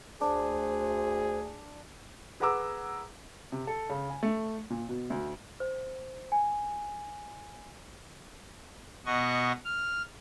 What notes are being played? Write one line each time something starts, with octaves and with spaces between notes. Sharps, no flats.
D2 D4 G#4 C5
G#4 B4 F#5 A#5 D6 E6
C3
A4
C#3
G#5
A3
A#2
B2
D2
C5
G#5
B2 D#5 F#5 C#6
F6